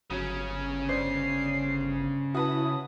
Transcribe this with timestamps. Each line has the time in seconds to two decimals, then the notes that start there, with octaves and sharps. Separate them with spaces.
0.11 G1 C#3 F#3 C#4
0.89 D4 C5 C7
2.35 E4 F#4 B4 A5 D#6